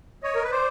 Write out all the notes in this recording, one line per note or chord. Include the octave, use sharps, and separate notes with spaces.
C#5 D#5
A#4
B4
C5 D5